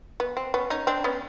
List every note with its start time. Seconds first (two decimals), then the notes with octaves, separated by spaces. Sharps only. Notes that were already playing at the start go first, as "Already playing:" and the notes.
0.20 B3
0.37 C4
0.54 B3 C#4
0.70 C#4 D#4
0.87 C4 D4
1.04 B3 C#4